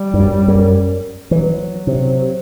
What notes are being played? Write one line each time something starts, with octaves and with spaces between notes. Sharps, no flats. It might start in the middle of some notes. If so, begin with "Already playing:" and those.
Already playing: G3
G2
F#2
F#2
E3 F#3
C3